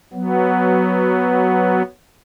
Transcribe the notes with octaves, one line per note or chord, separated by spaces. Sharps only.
F#3 B3